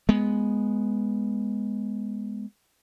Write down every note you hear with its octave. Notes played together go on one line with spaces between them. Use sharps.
G#3 B3